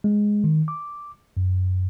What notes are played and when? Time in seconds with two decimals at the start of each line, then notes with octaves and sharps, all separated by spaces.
0.04 G#3
0.44 D#3
0.68 D6
1.37 F#2